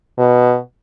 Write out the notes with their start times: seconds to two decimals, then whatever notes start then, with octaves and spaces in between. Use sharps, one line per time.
0.19 B2